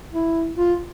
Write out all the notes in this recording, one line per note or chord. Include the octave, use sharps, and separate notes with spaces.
E4
F4